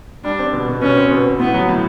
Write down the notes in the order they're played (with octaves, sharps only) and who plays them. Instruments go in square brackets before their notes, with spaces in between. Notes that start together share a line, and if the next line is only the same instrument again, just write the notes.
[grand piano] G3 [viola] D4
[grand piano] C4
B2
B2
[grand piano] B2 [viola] C#4
[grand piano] C4
B2
C4
[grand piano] A2 [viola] B3
[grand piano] F#3
A2